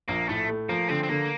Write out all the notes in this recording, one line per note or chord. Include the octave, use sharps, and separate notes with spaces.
A#1 A#3
A2 A3
A3
F3 A#3
D3 C4
C4
D3 A#3